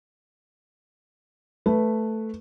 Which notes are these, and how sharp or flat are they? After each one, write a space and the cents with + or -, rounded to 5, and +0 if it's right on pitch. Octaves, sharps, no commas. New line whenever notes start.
A3 +0 B4 +0